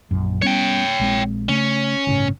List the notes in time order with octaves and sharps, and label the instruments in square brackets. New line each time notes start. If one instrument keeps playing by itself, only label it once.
[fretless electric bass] A#1 F#2
[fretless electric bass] G3 B3 C#4 [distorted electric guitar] C#5 G5
[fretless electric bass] A#1 G#3 C4
[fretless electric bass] C#3 A3 [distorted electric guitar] C#4
[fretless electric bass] G1 A2 C#3